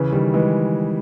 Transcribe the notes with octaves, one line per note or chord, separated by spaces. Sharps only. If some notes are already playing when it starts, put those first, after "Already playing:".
Already playing: C#3 E3
D#3 G3
E3 G#3